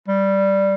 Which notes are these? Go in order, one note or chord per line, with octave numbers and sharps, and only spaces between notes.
G3